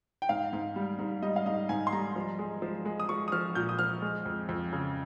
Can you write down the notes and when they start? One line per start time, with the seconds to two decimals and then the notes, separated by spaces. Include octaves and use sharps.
0.22 G5
0.29 G#2 F5
0.53 G#2
0.76 G3
0.99 G#2
1.22 G3 D#5
1.36 F5
1.46 G#2 D#5
1.69 G#2 G#5
1.87 C6
1.93 G3 A#5
2.16 F3
2.39 G#3
2.62 F3
2.85 G#3
3.00 D#6
3.09 F3 C#6
3.28 D#6
3.32 F3 F6
3.55 A#2 G6
3.69 D#6
3.79 F3 F6
4.02 G#3
4.26 F2
4.49 F2
4.73 C#3